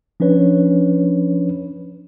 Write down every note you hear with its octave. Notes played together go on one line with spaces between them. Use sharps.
F3 C#4 D4 B4 C#5